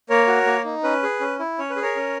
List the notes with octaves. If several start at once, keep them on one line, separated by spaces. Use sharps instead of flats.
A#3 A#4 C#5
F#4
A#3
D#4
C#4 B4
G#4
C#4
E4
C#4 C#5
B4
G#4
A#4 C#5
C#4